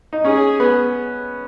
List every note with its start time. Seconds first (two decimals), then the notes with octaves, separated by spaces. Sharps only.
0.13 D#4
0.25 C#4 G#4
0.60 B3